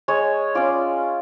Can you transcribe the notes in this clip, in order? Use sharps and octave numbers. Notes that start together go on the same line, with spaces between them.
G#3 C#5
C#4 F4 D5